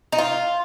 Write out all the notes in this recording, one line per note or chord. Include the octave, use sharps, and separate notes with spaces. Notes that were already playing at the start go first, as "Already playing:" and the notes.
D#4
F4